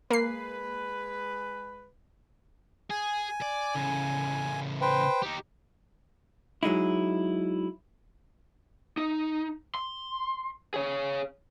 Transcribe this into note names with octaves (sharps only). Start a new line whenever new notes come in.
G#3 A#3 B4 C7
G#4 G#5
D5
A2 C#3
B4 C5 G5
D#4 G4
F#3 G#3 D#4 E4
D#4
C6
G#4 C#5